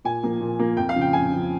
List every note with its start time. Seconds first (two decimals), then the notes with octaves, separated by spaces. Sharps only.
0.04 A#2 G#5
0.23 F3 A#3
0.41 A#2
0.59 F3 A#3
0.77 F2 G5
0.89 F5
0.96 C#3 F3
1.01 G5
1.13 F2 G#5
1.32 C#3 F3